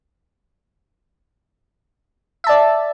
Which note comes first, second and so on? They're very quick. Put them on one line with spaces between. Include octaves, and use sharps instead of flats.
E5 A5 D5